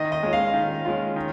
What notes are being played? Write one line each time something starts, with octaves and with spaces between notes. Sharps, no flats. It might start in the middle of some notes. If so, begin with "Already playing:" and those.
Already playing: D#3 D#5
D#5
G#3 C#4 F4
F5
D#3
G#3 C#4 F4
D#3